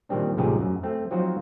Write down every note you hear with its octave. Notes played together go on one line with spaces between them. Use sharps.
A#2 D#3 G3 C4 D4
A1 C3 F3 D#4 G4 G#4
F#2
A3 C4
F3 F#3 C4 D#4 F4 F#4